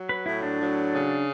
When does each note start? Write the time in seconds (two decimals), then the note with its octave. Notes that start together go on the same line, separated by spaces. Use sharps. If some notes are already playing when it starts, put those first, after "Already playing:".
Already playing: F#3
0.09 B4
0.26 A2 E4
0.43 D4
0.60 F#3
0.93 C#3